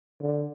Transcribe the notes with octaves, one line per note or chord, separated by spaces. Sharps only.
D3